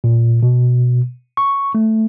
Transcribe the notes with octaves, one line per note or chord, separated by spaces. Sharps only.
A#2
B2
C#6
A3